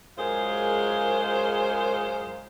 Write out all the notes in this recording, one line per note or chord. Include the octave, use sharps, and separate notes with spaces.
F#2 G#3 F4 G#4 A#4 C5